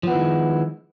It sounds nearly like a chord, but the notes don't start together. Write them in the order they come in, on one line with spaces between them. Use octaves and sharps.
F3 B3 E4 D#3 G#3